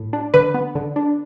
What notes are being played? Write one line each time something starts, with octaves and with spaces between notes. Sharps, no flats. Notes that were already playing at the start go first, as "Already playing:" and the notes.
Already playing: A2
D4
D3 B4
B3
D3
D4